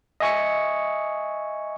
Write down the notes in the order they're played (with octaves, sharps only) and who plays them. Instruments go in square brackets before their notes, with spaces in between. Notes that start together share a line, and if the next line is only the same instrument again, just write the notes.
[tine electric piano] D#5 E5 G#5 C#6 D#6 C#7